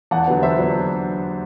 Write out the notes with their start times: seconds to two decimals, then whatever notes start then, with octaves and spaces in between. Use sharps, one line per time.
0.11 E2 F#5 A5
0.28 D3 F#3 B3
0.43 E2 C5 E5
0.59 D3 F#3 B3